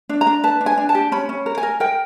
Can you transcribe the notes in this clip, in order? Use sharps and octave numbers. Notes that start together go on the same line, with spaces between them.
D4
A#5
D4
B4 A5
D4
G#5
D4
A5
G4
C#4 B5
C#4
A#4
G#5
A#4
A#4 G5